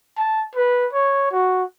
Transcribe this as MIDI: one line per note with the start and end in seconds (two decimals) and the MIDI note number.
0.17 0.43 81
0.55 0.87 71
0.93 1.27 73
1.32 1.63 66